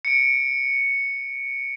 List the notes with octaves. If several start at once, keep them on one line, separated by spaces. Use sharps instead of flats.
C#7 D7